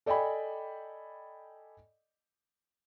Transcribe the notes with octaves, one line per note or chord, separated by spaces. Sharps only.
A4 D5 D#5 G5 G#5 B5